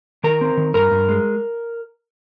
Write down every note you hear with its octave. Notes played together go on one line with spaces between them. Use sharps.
D#3 A#4 A#5
C4
D#3
G2 A#4 A#5
G2
G#3